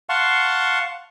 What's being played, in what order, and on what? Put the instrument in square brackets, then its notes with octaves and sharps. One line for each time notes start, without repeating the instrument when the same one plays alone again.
[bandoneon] F5 F#5 A5 C6 C#6